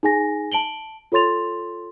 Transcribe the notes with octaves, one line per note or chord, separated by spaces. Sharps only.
D#4 G#4 G#5 A#6
A5 D7 F#7 G7
F4 A4 C#5 C6 A6 F7